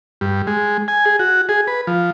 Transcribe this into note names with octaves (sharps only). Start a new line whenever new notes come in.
G2
G#3
G#5
G#4
F#4
G#4
B4
F3